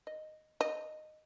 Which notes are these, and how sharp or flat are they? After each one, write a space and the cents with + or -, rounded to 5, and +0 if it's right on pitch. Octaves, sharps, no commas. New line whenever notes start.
D#5 -5
D#5 -10